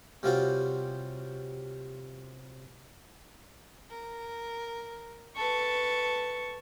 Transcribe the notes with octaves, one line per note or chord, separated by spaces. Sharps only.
C3 G3 C#4 F4 F#4 C5
A#4
A4 B4 A5 C#6